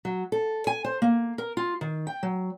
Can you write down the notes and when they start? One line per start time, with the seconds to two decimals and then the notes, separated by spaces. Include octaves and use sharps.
0.05 F#3
0.32 A4
0.67 G#5
0.84 C5
1.02 A#3
1.38 A#4
1.57 F4
1.81 D#3
2.07 G5
2.23 F#3